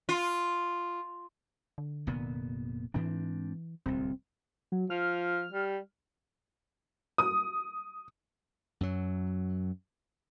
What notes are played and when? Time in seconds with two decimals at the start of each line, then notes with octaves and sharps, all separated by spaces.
0.09 F4
1.78 D3
2.07 F1 A#2 B3
2.94 G#2 E3 C4 D4
3.86 D1 C2 C4
4.72 F#3
4.90 F3 F6
5.52 G3
7.18 D#6
8.81 F#2 F#3